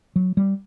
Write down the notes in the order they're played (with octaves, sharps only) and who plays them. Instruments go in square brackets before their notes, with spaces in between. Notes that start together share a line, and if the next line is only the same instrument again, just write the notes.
[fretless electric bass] F#3
G3